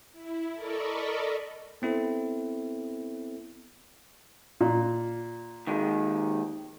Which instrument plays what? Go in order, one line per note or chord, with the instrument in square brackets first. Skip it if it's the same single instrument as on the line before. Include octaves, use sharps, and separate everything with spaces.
[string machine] E4
A4 A#4 D5 D#5 B5 C#6
[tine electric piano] B3 C4 E4 A4
[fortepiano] A#2
[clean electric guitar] D#2 D#3 G#3